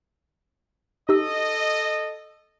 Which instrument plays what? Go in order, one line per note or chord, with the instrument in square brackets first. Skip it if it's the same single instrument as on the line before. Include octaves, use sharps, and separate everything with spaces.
[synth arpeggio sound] D#4 G4 E6 [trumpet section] A4 D#5